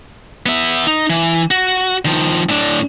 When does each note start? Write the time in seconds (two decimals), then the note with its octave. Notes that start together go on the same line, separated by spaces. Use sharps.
0.46 B3 E5
0.87 D#4
1.10 E3
1.51 F#4
2.05 D#3 F3
2.49 A2 D4